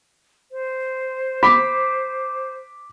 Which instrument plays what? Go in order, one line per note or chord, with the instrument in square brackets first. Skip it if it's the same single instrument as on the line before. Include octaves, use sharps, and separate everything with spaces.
[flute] C5
[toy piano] B5 [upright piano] D6 B6